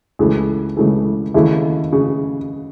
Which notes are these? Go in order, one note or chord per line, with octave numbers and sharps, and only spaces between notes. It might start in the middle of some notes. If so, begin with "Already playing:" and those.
C#2 C#3 E3 A3
C#2 C#3 E3 A3
D#2 C#3 E3 A3 E4
C#3